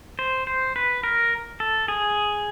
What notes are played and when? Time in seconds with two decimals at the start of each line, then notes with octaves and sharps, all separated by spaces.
0.19 C5
0.47 C5
0.76 B4
1.04 A#4
1.60 A4
1.88 G#4